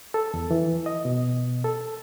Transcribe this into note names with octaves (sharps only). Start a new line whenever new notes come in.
A4
E2
E3
D#5
B2
A4